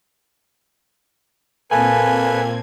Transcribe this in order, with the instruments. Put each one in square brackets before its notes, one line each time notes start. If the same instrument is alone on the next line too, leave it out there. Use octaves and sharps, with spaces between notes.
[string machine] A#2 C4 G#6 [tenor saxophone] A#3 [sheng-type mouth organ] A4 B4 [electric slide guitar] G#5